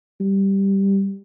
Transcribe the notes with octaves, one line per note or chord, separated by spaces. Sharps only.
G3